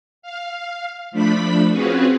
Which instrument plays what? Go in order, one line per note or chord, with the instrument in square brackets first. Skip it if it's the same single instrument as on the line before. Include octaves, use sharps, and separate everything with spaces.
[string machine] F5
F3 A3 D4 B5 B6
C4 C#4 F4 F#4 G#4 B4